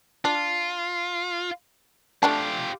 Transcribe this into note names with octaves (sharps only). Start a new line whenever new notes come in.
D4 F4
A3 D4 F4 G4 A5